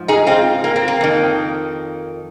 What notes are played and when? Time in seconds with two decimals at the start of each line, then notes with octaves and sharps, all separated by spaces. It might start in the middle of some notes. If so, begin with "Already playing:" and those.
Already playing: G#2 F3
0.08 D#4 G#4
0.27 C4 F4
0.64 A#3
0.76 C4
0.88 A#3
1.01 F2 D#3